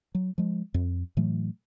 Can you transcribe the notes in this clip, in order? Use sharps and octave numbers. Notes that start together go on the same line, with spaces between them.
F#3
F3 G#3
F2
A2 E3 F#3 A3